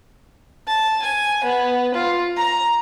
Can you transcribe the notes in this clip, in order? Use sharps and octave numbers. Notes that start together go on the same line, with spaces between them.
A5
G#5
B3
F4
A#5